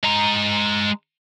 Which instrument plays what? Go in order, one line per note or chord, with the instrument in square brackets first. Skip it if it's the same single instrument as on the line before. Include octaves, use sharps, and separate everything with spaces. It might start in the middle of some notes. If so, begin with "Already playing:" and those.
[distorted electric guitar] G#3 A#5